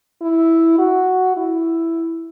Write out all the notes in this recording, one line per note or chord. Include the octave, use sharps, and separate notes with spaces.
E4
F#4
E4